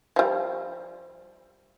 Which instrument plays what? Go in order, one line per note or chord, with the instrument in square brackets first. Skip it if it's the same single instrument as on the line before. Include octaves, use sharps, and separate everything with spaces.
[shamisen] F3 G3